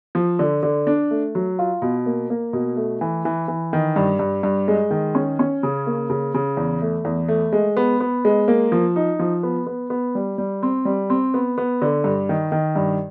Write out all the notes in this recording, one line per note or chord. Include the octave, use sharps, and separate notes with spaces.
F3
D3
D3
D4
A3
F#3
F4
B2
A#3
A#3
B2
A3
E3
E3
E3
D#3
G2
G2
G2
G#3
D#3
C#4
C#4
C#3
A#3
C#3
C#3
E2
A3
E2
A3
G#3
B3
B3
G#3
A#3
F3
D#4
F3
B3
B3
B3
G3
G3
C4
G3
C4
B3
B3
D3
G2
D#3
D#3
G2